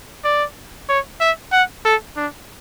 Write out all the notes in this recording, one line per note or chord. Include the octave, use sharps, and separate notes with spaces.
D5
C#5
E5
F#5
A4
D4